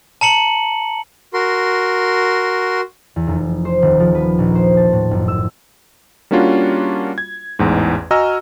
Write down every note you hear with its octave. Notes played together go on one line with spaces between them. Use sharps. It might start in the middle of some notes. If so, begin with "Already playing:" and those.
A5 A#5 C#7 F#7
F#4 A#4 C6
E2
F1
C5
D#1
F3
B4
A#1
C5
A5
A2
F#1
E6
G3 A#3 C#4 D4 F4 F#4
G#6
A1 E2 G#2
F#4 D#5 G#5 A#5 E6 F6